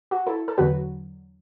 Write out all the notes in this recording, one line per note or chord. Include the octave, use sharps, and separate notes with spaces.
F#4
E4 A4
A4
E2 D3 F#3 F#4 B4